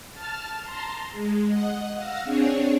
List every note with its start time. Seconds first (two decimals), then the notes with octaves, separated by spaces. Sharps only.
0.14 A5 F6 A6
0.61 A5 A#5 C6
1.12 G#3
1.46 D#5 F#5
1.95 F5 F#5 E6 A#6
2.24 C4 D4 G#4 C#5